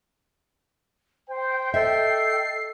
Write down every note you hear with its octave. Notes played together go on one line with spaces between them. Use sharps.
C5 G5
A4 D#5 E5 C7